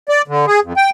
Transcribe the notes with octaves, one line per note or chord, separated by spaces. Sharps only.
D5
D3
G#4
F2
G5